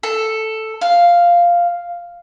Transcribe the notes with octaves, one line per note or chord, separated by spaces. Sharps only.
A4
F5